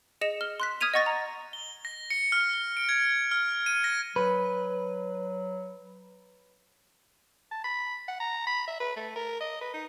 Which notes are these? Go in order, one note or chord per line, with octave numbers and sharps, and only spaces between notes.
G#4 D#5 C#7 E7
F6 G7
C6 F#6 B6
D#6 F6 G#6 B6 D#7 F7
D#5 F#5 C#6 A6 A#6
A#5
G7
A#6
C#7
F6
F6
D7
G#6
F6
D#7
A#6
F#3 B4
A5
B5
F#5
A#5
B5
E5
B4
A3
A#4
D#5
B4
D#4